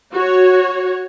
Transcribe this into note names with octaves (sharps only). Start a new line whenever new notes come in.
F#4 C#5